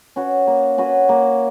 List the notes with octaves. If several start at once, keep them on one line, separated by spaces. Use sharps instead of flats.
C#4 F#4 B4
A#3
C#4 F#4 B4
A#3